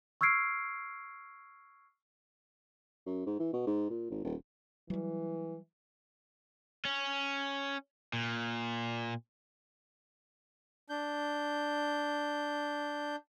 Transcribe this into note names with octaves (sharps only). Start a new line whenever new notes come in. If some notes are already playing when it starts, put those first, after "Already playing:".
C#6 E6 F6 G#6 C7 D7
F#2
G#2
E3
B2
G#2
A#2
G#1
D#1
E3 F#3 G3
C#4
A#2
D4 G6